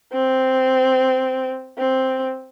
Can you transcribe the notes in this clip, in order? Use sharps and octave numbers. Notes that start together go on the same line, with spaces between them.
C4
C4